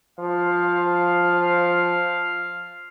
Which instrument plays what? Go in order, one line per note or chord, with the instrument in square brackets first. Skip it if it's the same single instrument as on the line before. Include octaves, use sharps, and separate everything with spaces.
[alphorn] F3 [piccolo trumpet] F5